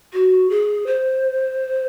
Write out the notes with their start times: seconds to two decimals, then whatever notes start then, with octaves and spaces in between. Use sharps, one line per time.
0.13 F#4
0.49 G#4
0.86 C5